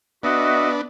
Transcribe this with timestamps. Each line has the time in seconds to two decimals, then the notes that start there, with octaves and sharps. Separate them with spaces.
0.23 B3 D4 F#4 D#5 E5